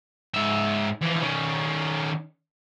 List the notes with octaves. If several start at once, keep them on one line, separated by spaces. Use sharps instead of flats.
G#2 E5
E3 F3
D#3 C#4